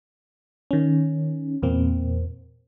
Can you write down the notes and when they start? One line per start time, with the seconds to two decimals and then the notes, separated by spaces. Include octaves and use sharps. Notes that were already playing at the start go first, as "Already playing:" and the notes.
0.71 D#3 C#4
1.62 E2 A#2 A#3 C4